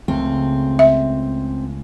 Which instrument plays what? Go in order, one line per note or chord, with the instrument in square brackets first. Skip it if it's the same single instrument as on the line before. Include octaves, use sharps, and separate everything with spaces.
[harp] C#2 A3 [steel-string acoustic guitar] C4
[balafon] E5